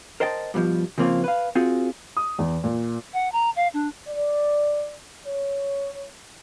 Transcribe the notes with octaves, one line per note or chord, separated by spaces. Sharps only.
A#4 C5 D#5 G5 A5
G2 B2 E3 F3
C#3 F3 A#3 C4 F4 C#5
B4 F5
C4 F4 F#4 G#4
D#6
E2
A#2
F#5
A#5
F5
D4
D5
C#5